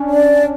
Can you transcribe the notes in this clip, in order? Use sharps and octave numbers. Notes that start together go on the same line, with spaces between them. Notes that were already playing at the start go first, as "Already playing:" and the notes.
Already playing: C#4 D4
D5